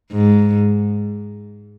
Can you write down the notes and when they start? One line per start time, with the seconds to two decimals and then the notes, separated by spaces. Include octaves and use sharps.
0.12 G#2